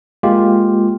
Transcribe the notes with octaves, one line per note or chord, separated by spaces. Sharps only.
G#3 A#3 F4 G4